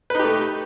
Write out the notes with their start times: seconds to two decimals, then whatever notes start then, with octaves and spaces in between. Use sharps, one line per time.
0.10 B4
0.15 D#4
0.19 G4
0.24 A3